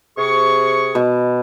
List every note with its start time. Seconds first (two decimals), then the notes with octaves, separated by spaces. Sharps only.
0.18 C3 G#4 C#6
0.95 B2